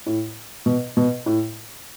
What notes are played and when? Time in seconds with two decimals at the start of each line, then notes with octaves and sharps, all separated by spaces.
0.06 A2
0.66 B2
0.97 B2
1.26 A2